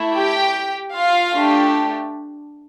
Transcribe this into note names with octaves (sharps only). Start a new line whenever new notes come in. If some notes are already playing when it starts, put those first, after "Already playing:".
Already playing: A3 E4
G4 G5
F4 F5
A3 D4 G4